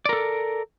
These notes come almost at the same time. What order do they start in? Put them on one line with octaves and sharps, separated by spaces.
D5 A#4 A4